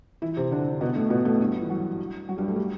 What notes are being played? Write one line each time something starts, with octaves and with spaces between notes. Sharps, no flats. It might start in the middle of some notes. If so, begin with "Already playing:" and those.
E3 E4
C3 C4
D3 D4
B2 B3
A2 A3
B2 B3
A2 A3
G2 G3
E3
F#3
F#3
G2 G3
A3
G3